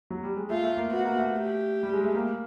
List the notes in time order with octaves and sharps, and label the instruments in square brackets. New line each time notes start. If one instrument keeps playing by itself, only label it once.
[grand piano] F#3
G3
G#3
[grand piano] A3 [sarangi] F4
[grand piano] A3
A#3
[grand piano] B3 [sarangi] F#4
[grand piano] A#3
A3
[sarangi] G4
[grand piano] G3
G#3
A3
A#3